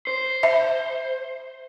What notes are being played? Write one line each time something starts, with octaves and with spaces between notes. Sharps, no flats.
C5
E5